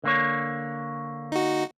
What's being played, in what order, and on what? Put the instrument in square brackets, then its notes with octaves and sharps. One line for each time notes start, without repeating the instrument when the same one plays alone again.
[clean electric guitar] D3 A#3 C#5
[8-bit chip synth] D#4 F#4